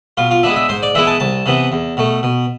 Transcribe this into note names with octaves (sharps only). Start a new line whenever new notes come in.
B2 F4
F4
G#3 B3 D4 E5
E5
G#2 C5
D5
E3 G#3 B3 E4 E5
A5
C2 A5
C3 E3 B3
E2
B2 A3
B2